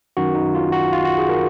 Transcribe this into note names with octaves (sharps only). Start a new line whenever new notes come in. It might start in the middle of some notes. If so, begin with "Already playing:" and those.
F#2 D#3 F#4
D#4
F4
F#4
F4
F#4
G#4
A#4